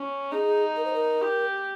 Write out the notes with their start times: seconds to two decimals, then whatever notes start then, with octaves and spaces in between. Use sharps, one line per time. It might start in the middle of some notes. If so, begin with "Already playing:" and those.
Already playing: C#4
0.31 D#4 G#4
0.77 A#4
0.85 C5
0.94 A#4
1.21 G4